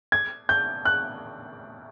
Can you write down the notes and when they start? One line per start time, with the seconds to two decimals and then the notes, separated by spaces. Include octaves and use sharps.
0.12 G#6
0.49 G6
0.85 F#6